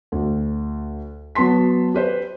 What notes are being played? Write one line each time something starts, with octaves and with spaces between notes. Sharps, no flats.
D2
F#3 B3 A5 C6 B6
G4 B4 C5